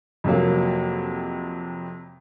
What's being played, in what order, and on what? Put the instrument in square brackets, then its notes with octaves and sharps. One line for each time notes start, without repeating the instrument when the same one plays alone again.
[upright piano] F2 C3 F#3 A#3